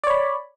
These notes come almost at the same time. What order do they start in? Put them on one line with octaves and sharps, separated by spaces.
D5 C#5 B5